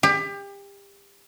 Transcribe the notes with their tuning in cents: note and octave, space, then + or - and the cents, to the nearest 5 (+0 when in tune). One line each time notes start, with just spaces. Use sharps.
G4 +30